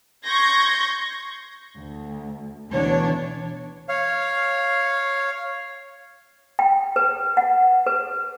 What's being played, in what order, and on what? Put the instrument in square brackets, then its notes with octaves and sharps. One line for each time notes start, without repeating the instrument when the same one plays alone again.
[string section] C6 C#6 G6 G#6 A#6
[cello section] D2
D2 B2 E3 D4 C#5
[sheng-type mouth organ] C#5 F5
[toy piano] G5
B4
F#5
B4